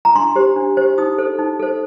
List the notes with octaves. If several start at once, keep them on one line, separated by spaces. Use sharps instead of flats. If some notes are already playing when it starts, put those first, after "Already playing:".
A#5
D4 C6
G4 C5
D4
G4 C5
D#4 D#6
A4 C5
D#4
A4 C5